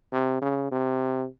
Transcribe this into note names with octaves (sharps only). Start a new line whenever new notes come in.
C3
C#3
C3